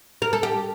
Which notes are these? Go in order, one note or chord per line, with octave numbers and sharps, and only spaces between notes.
A#4
A4
G4